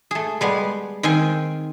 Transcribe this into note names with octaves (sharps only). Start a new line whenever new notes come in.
A3 G#4
G3 G#3 B3
D#3 C4 G5 G#5 C6